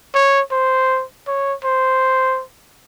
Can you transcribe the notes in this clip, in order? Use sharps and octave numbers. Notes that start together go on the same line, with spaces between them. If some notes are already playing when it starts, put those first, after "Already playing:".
C#5
C5
C#5
C5